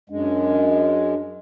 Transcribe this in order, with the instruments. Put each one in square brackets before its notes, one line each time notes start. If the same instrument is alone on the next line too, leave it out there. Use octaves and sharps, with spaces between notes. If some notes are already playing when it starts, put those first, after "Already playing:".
[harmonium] F#2 G#3 [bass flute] D4